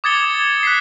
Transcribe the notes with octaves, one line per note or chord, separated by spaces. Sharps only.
D6 D#6 G#6 A6 C#7 G7
F#6 B6 C7